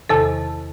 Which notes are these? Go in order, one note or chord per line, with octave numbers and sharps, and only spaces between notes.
E2 C3 D#3 A4 A5